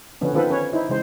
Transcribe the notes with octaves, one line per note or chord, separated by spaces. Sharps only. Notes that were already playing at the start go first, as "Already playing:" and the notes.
D3 F3 B3 C#4
D#3 B3 C4 F4 A4 B4
C#4 B4 C#5
D#4 E4 C5
C#3 E3 G#3 C5